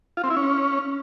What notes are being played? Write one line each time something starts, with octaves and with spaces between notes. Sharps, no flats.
F4
C4
E4
C#4